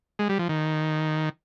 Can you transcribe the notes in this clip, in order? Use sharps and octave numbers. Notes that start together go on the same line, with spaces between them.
G#3
G3
F3
D#3